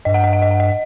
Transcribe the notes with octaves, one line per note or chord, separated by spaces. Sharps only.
G2 D#5
F#5
D#5
F#5
D#5
F#5
D#5